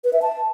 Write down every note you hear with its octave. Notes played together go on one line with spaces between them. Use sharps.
B4
E5
A5